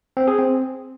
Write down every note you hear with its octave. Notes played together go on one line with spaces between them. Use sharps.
C4
G#4
C4